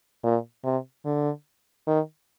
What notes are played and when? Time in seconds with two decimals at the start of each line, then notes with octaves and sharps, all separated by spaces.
0.24 A#2
0.64 C3
1.05 D3
1.87 D#3